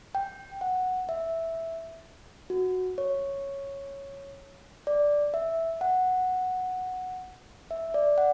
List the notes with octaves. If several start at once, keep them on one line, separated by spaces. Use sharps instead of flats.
G5
F#5
E5
F#4
C#5
D5
E5
F#5
E5
D5
F#5